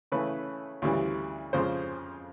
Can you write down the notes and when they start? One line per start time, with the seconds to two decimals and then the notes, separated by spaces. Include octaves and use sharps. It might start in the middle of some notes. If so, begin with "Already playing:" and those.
0.12 C#3 E3 A3 C#4 B4
0.82 D2 C#3 E3 G3
1.53 F2 C#3 F3 G#3 C5